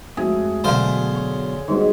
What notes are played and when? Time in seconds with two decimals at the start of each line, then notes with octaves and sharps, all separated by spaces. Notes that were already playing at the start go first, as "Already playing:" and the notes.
0.17 F2 G#3 A3 F#4 G#4
0.64 F#2 B2 D3 C5 F5
1.15 C#5
1.68 G#2 B2 D#3 G3